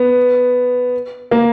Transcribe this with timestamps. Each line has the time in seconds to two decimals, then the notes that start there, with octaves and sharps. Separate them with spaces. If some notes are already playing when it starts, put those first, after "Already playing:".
Already playing: B3
1.31 A#3